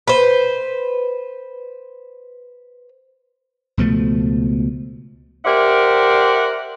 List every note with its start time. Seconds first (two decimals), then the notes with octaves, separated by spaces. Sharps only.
0.07 B4 C5
3.77 C#2 B2 F3 A3
5.45 G4 A#4 C5 D5 E5 F#5